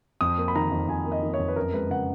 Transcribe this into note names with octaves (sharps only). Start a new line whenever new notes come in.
F2 D#6
A#3
B5
D#3 A#5
F2
F2 G#5
A#3
D#5
D#3
C#5
F2
B4
F#2 A#4
G#3 B4
C#3 F#5